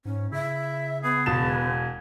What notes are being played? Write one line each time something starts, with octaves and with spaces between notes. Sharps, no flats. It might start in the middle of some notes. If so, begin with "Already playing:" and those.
G#2 C#4
C#3 E4 E5
B3 G#4
E1 A5 E7
G#5